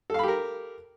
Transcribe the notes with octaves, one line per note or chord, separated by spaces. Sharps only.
G4 A4 A#4 F5 B5